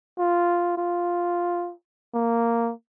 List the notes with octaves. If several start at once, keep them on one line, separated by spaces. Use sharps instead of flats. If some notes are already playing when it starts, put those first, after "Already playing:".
F4
F4
A#3